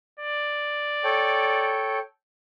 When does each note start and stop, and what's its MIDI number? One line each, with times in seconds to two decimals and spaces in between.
0.20 1.77 74
1.04 1.99 69
1.04 1.99 73
1.04 1.99 79